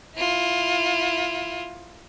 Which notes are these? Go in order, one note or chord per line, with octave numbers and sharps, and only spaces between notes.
E4 F4